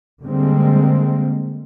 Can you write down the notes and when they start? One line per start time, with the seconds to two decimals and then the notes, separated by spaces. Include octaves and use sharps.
0.22 D3 G3 G#3 A#3 C4